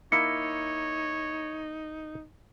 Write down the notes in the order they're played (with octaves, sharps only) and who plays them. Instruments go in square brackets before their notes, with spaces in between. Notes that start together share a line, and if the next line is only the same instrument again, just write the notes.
[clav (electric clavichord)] A#3 E4 [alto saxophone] D#4 [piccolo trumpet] C#5 [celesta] C#7